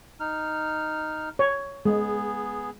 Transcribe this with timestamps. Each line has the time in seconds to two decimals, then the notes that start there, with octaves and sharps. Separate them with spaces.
0.20 D#4 F6
1.39 C#5
1.85 G#3 B3 G#4